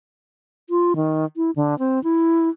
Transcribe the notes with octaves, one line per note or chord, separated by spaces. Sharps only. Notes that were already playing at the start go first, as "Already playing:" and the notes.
F4
D#3
E4
D3
C4
E4